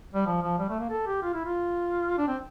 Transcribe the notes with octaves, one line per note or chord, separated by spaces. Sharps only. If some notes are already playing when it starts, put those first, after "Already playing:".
G3
F3
F3
G3
A3
A#3
A4
G4
F4
E4
F4
D4
C4